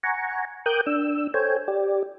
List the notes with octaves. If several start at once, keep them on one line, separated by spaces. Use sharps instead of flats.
F#5 G#5 A#5 C#6
A#4 G5 D6 D#6 F#6 G6
D4 E6
A4 C5 C#5 G5 G#5
G4 D5